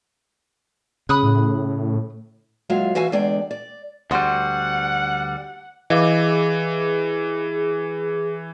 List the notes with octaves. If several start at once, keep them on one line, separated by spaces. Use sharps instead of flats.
C#3 B5 D#6 F#6
A2
D#2 F#3 G#3 F4 E5 F5
E3 F#4 E5 F5 G#5
E2 D3 G#3 D4 D5 G5
D5
D2 G3 F#4 F#5 C6 D#6
E3 G#4 D#5 F5 D6